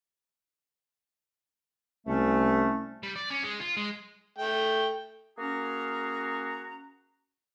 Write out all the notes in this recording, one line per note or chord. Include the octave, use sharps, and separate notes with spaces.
C2 A3 C#4
G3
D5
C#4
G#3
F4
G#3
A3 G5
A#3 C#4 F#4 G#4 A#5